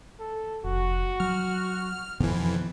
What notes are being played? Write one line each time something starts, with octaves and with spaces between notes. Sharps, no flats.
A4
F1 F#4
F#3 F6
F2 B2 D#3 E3 B3